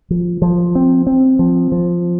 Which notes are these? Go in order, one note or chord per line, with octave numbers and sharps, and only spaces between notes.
F3
F3
C4
C4
F3
F3